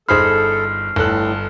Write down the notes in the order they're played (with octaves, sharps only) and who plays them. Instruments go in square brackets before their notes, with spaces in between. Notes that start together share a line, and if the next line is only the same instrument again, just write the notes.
[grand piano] G1 B5 [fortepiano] D#4 G#4 C5 [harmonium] A4 [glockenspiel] F6 C7
[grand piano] G1 A4 F#6 [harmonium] A2